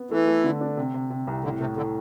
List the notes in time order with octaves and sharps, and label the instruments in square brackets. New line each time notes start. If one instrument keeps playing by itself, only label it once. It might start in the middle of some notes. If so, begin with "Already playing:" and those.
Already playing: [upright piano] B3
[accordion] E3 [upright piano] A3
[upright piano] A3
D3
D4
C3
C3
C3
C2
[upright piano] A2 [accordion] D3
[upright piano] A2 [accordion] C3
[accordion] D3 [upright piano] A3